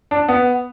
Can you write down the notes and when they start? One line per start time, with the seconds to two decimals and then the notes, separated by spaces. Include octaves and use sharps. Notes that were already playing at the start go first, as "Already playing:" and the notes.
0.11 D4
0.28 B3